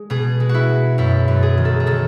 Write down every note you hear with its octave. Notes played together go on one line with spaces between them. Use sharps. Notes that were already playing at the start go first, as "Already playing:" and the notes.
Already playing: G#3
B2 G#4
G#3
F#4
E4
G#3
F#2 E4
F#2
G#4
D#3
A4
G#4
D#3 A4